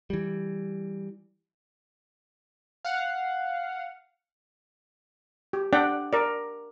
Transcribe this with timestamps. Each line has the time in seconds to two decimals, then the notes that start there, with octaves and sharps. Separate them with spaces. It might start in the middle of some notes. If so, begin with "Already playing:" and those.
0.10 E3 G3
2.85 F5 F#5
5.53 G4
5.73 D4 D5 F#5 G5
6.13 A#4 D5